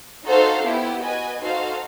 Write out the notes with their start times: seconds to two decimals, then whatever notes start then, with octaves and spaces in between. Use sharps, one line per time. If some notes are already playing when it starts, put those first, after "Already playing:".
0.24 D#4 F#4 A4 C5 F5
0.63 B3 E4 G4
1.01 F#4 B4 D#5 G#5
1.40 D#4 F#4 A4 C5 F5